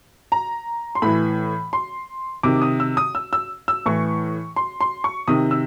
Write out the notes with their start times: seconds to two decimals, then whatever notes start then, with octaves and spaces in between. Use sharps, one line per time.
0.32 A#5
0.95 C6
1.02 A2 E3 B5
1.73 C6
2.43 C3 D#3 D6
2.62 D#6
2.80 E6
2.97 D#6
3.15 E6
3.33 E6
3.68 E6
3.86 A2 E3 C#6
4.56 C6
4.81 C6
5.04 C#6
5.28 C3 D#3 D#6
5.51 E6